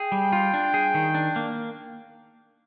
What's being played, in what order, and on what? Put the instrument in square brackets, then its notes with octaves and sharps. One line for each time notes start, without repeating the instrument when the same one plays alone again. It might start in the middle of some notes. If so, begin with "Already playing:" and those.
Already playing: [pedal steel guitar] G#4 [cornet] G5
[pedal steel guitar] G3
F4
D4
G#4
D#3
D4
A#3